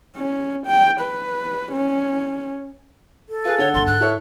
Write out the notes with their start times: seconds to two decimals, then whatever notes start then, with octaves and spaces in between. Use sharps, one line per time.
0.16 C#4
0.67 G5
1.00 B4
1.72 C#4
3.29 A4
3.45 F4 G#4 B4
3.58 D3 C#5 F#5 G7
3.74 G1 A#2 C6
3.87 G#2 F#6
4.00 E4 A4 C#5